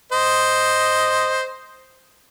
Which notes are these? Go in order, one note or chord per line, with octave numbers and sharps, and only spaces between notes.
C5 D#5